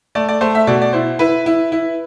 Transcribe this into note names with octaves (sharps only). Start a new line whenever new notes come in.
A3 D5
D5
A3 C5
E5
B2 D5
D5
E4 C5
E4 B4
E4
E4